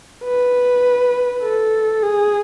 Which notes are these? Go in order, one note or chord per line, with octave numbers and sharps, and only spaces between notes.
B4
A4
G#4